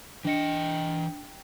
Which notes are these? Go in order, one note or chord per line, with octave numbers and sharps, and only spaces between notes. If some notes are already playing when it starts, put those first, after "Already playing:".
E3 D4 D#5 G5 C#7